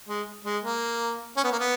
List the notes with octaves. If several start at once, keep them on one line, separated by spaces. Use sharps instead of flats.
G#3
G#3
A#3
C#4
B3
A#3
B3